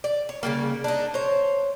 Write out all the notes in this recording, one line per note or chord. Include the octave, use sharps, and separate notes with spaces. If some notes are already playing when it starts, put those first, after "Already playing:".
D5
C#5
C#3 F#3 G3 A#3
D4 D#4
C5 C#5